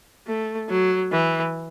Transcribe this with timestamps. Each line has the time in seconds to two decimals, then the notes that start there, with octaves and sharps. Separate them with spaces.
0.27 A3
0.69 F#3
1.11 E3